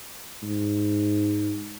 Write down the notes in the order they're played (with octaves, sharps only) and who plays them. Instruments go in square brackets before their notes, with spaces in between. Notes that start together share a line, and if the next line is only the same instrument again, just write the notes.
[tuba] G#2